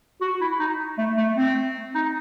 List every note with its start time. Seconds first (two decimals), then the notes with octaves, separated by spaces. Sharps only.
0.21 F#4
0.41 E4
0.60 D#4
0.98 A3
1.17 A3
1.37 C4
1.95 D#4